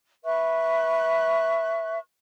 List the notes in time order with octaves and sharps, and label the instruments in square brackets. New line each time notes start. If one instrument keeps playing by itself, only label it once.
[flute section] B4 E5 C#6 F#6